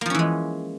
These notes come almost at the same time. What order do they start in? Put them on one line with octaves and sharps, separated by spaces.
A#3 F3 C#4 E3 G#3